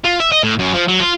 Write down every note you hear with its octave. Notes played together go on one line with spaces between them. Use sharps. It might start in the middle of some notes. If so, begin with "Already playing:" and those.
F4
E5
D#5
A2
F#2
F3
F#3
F4